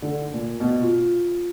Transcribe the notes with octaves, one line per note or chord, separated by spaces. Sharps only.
D3
A#2
B2
F4